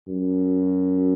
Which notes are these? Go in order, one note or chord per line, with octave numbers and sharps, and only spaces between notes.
F#2